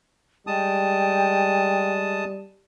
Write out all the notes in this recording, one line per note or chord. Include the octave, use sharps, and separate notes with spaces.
G3 G#3 G5 A5 D#6